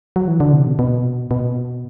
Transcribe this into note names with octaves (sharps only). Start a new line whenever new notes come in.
F#3
E3
D3
C3
B2
B2
B2